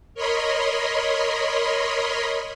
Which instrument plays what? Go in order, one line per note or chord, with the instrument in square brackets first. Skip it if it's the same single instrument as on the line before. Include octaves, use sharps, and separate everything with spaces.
[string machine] A#4 C#5 D#5 B5 C6